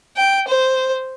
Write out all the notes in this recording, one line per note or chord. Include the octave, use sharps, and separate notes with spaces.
G5
C5